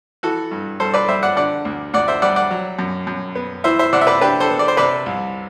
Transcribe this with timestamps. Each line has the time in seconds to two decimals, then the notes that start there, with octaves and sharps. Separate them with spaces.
0.23 E3 F#4 A4
0.51 G2
0.80 G2 A4 C5
0.94 B4 D5
1.08 G3 C5 E5
1.23 D5 F#5
1.36 D3 D5 F#5
1.65 D2
1.93 D2 D5 F#5
2.08 C5 E5
2.22 G3 D5 F#5
2.36 D5 F#5
2.51 F#3
2.79 F#2
3.07 F#2
3.35 B3
3.64 E3 C5 E5
3.79 C5 E5
3.93 C3 D5 F#5
4.01 E5
4.07 B4 D5
4.21 D4 G4 B4
4.40 A4 C5
4.50 B3
4.59 D5
4.68 C5
4.77 C3 B4 D5
5.06 C2